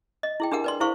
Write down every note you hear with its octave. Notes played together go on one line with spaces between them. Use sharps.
D#5
E4 G#4 G5
D4 G4 G#4 A#4 F#5
B4 D5 C6
E4 G#4 C5 F5 C#6